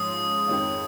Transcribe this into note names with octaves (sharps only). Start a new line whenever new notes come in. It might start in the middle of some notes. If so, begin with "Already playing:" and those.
Already playing: G#2 F3 G#3 C#4 F4 D#6
F2 D#3 G#3 C#4 F4